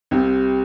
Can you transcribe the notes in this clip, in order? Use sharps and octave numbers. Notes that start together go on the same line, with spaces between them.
C2 C3 G3